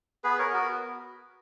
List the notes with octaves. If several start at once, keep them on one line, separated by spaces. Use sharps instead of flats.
B3 G#4 B4
A#4 C#5
B3
F#4 A#4